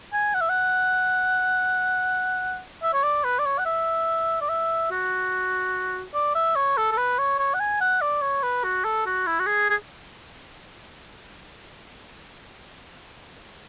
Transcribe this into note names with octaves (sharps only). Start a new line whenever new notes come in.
G#5
F#5
E5
F#5
E5
C#5
D5
B4
D5
C#5
F#5
E5
D5
E5
F#4
D5
E5
C#5
A4
A4
B4
C#5
C#5
F#5
G#5
F#5
D5
C#5
B4
F#4
A4
F#4
E4
F#4
G#4
G#4